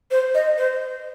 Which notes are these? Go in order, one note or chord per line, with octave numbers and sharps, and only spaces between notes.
C5
D#5
C5